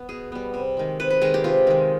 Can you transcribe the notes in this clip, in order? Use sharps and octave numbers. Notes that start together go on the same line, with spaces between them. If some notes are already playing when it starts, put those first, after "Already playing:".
Already playing: B3
B2 G#4
G3 B3
C3
D#3 G#3
C3 B4
B4
D#3 G#3 G#4
G4
C3 F4
D#3 G#3